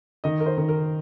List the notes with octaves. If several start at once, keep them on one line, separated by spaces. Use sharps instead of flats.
D#3 D#5
A#4
C5
D#3
A#4